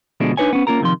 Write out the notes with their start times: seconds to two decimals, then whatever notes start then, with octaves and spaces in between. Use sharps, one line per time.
0.20 D2 B2 F3 G#3 A3 D4
0.37 D4 D#4 B4 C#5 G#5
0.53 B3 C#4
0.67 A#3 C#4 F4 A#4 A#5
0.81 D#2 C3 D#3 F3 C6